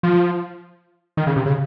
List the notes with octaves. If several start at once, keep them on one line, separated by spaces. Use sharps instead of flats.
F3
D#3
C#3
C3
C#3